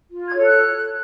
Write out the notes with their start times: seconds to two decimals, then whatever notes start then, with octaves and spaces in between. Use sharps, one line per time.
0.09 F4
0.27 G#6
0.36 A4 C#5
0.44 F#6